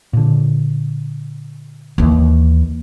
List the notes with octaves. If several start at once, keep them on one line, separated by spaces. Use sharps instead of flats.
A#2 D3
D#2 E3